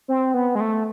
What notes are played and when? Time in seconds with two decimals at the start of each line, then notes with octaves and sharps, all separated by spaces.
0.08 C4
0.34 B3
0.55 G#3
0.60 A3